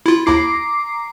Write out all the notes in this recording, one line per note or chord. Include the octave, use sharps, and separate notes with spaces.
E4 F4
D#2 E4 A#5 D6 C7